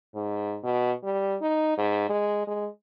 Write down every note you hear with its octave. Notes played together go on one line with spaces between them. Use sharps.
G#2
B2
G3
D#4
G#2
G#3
G#3